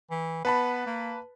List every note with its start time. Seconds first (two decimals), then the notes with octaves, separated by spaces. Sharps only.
0.11 E3
0.45 B3 B4 A5 B5
0.87 A#3